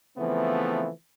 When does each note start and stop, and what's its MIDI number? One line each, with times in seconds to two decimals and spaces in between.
0.18 0.89 49
0.18 0.89 52
0.18 0.89 53
0.18 0.89 57
0.18 0.89 59
0.18 0.89 60